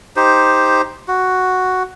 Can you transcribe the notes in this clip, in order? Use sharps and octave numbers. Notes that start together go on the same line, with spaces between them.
D#4 G4 C5
F#4